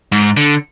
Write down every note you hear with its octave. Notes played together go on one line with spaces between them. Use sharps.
G#2
D3